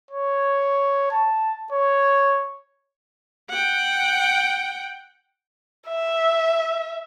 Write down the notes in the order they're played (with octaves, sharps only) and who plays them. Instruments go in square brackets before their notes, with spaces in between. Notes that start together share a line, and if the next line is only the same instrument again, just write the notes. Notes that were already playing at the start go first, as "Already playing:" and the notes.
[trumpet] C#5
A5
C#5
[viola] F#5 G5
[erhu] E5